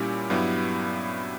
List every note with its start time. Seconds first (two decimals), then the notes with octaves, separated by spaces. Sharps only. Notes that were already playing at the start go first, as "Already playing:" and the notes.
Already playing: A#2 G3 C#4 E4 G4
0.30 G2 F#3 B3 E4 G4